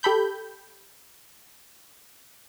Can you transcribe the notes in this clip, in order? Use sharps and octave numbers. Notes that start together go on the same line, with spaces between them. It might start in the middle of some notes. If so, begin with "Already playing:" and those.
G4 A4 B5 G6